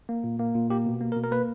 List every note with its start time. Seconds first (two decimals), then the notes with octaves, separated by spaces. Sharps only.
0.09 A#3
0.24 A#2
0.39 A#3
0.54 A#2
0.70 A#3 G4
0.86 B2
1.01 A#3
1.12 A#4
1.16 B2
1.24 A#4
1.31 A#3 B4